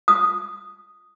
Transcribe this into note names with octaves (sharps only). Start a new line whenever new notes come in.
D#6